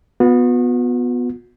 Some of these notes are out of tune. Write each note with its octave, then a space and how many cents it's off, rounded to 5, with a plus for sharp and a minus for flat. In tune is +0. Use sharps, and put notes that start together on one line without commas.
B3 +0 F#4 -45